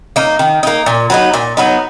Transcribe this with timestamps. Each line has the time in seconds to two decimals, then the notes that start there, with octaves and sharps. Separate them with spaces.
0.16 A#3 D#4
0.39 D#3
0.63 A#3 D#4
0.86 A#2
1.10 F#3 B3 D#4
1.34 A#2
1.57 F#3 B3 D#4